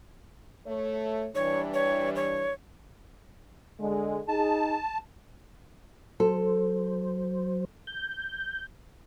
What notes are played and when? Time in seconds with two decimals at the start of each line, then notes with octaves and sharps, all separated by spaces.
0.66 A3 C#5
1.35 E3 G3 D4 C#5
1.74 C#5
2.16 C#5
3.80 D3 G#3
4.28 D#4 G#4 A5
6.20 F#3 A4 C5
7.87 G6